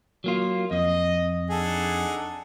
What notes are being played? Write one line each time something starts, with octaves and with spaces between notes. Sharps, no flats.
F#3 A#3 F4
F2 D#5
D4 D#4 G#4 A4 F#5